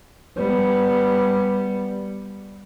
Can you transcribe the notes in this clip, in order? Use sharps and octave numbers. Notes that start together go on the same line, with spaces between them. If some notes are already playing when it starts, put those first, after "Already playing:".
G3 B3